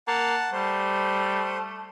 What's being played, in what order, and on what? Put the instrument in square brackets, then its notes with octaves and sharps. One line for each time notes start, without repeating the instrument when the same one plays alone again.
[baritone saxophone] A#3 [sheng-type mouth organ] F#5 A5
[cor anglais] G3 [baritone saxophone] A3 [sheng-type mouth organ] C5